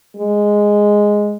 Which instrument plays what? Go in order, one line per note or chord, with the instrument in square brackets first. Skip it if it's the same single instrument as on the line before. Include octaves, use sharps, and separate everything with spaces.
[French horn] G#3